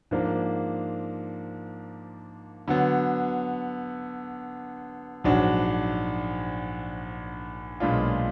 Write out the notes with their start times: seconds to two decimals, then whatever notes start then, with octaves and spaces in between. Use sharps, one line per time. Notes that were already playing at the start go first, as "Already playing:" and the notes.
0.11 G#2 F3 A#3 D4
2.68 D3 F#3 B3
5.24 A#1 G#2 F#3 D4 F#4
7.80 B1 A#2 G#3 D4 F4